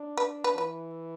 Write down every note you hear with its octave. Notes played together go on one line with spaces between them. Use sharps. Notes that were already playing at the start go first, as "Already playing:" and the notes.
Already playing: D4
B4
B4
E3 B4